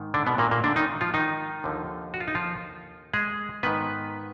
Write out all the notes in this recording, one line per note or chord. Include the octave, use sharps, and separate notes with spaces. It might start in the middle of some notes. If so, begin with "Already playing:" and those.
Already playing: G#2 D#3
D3 D4
B2 B3
A#2 A#3
A#2 A#3
D3 D4
D#3 D#4
F3 F4
D#3 D#4
D#2 D3 F3
F#4
F4
D#4
F3 F4
G#3 G#4
G#2 D#3 B3 B4